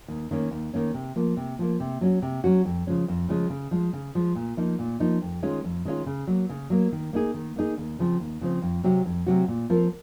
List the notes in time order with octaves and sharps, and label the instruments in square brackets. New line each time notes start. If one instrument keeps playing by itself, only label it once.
[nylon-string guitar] D#2
D#3 A#3 C#4
D#2
D#3 A#3 C#4
C3
F3 A#3
C3
F3 A#3
C3
F#3 C#4 F#4
C3
F#3 C#4 F#4
F2
C#3 F3 G#3 C#4
F2
C#3 F3 G#3 C#4
C#3
F3 G#3
C#3
F3 G#3
A#2
F3 A#3 D#4
A#2
F3 A#3 D#4
F2
D#3 G#3 C#4 F4
F2
D#3 G#3 C#4 F4
C#3
F#3 A#3
C#3
F#3 A#3
D#3
A#3 D#4 G#4
D#3
A#3 D#4 G#4
D#2
C#3 F3 C4
D#2
C#3 F3 C4
F2
C3 F#3 C4 F#4
F2
C3 F#3 C4 F#4
A#2
F3 C4 F4 A#4